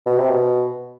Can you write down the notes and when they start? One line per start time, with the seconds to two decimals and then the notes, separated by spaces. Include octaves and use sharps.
0.06 B2
0.18 C3
0.30 B2